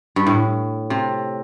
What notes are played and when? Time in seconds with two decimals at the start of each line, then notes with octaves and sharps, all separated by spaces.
0.16 G2
0.27 A2
0.90 C3